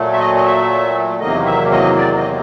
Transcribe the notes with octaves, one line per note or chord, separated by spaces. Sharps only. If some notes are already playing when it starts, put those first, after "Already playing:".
Already playing: A#2 F#3 A3
E5
D#5
D#5
E5
E2 C3 D#3 F#3 A#3 D#5
E5
D#5
D5
D#5